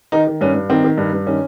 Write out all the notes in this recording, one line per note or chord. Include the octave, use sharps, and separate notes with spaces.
D#3 D#4
D#3
G2 C#4
G2
D#3 C4
D#3
G2
G2
D#3 C#4